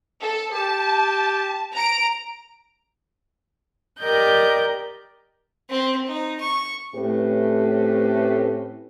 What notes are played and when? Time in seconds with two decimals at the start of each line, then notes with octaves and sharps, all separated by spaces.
0.21 A4
0.53 G4 A5
1.74 A#5 D7
4.00 G4 A#4 D5 D#5 G6
5.70 C4
6.07 D#4
6.40 C#6
6.94 A2 A3 C4 C#4 G4 B4